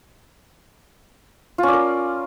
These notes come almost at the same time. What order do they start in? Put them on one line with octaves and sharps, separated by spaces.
F4 C#4 D5 A#4